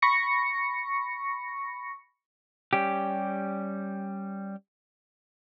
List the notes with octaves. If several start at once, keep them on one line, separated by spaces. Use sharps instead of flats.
B5 C#6 A#6 C#7
G3 C#4 G4